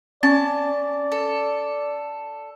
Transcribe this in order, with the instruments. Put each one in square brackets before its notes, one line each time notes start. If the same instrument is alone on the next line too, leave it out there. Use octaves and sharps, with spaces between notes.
[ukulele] C#4 [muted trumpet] D5 [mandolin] A5
[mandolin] A4